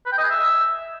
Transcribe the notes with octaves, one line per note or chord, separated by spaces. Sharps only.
B4
G5
D#5
G#4
E5